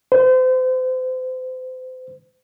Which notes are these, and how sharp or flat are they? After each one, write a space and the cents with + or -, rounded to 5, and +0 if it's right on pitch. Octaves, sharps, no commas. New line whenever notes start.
C5 -35